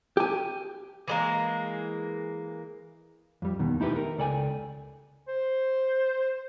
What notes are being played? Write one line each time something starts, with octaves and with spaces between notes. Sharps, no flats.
G4 G#5
E3 G#3 A#3
F2 G3
D#2 B2 D#3
A3 D#4 E4 G4 B4
A#4
C#2 A4 D5 G5 G#5
C5